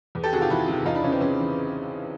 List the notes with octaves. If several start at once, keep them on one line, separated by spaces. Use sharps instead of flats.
E2
G4 A4
C3 D#3 F#4 G#4
F4 G4
E2 E4 F#4
C3 D#3
E2 D#4 F4
D4 E4
C#3 E3 C#4
C4
E2 C#4
C#3 E3